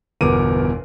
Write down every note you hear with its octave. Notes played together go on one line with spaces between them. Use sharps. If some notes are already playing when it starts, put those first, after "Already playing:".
G1 E2 B2 A#4 D6 D#7